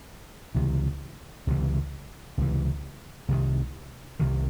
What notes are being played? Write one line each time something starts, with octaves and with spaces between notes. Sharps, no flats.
C#2 C3 E3
C#2 C3 E3
C#2 C3 E3
C2 C3 D#3
C2 C3 D#3